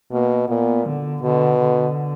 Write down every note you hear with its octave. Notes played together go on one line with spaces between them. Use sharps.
B2 A#3
A#2 B3
D3
B2 D3
D3